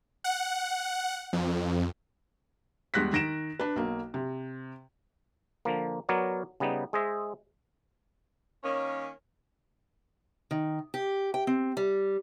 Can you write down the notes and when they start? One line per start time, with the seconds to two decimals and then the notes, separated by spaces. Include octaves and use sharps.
0.24 F#5
1.33 F2
2.94 E2 G3 G#3 F#6 A#6 B6
3.13 D#3 A#6 D7 E7
3.60 D4 B4
3.76 B1 A#3
4.14 C3
5.65 D3 F3 A#3
6.09 F#3 B3 A#4 C#5 D5
6.60 C#3 G3 B3 D#4
6.93 G#3 G#4 C5 D#5 E5
8.63 D#3 A#3 C#4
10.51 D#3
10.94 G4
11.34 G5
11.47 C4
11.77 G3